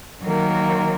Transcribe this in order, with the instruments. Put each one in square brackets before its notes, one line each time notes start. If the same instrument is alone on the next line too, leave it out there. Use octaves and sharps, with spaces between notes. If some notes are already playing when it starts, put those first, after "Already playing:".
[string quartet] D#3 F#3 A#3